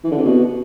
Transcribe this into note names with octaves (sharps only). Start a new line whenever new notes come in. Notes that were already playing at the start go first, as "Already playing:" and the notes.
E3
D3
C3
B2